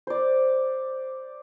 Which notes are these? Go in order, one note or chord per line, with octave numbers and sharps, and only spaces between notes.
C5 D5